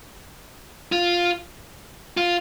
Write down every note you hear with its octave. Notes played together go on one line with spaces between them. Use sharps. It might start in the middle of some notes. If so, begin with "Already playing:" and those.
F4
F4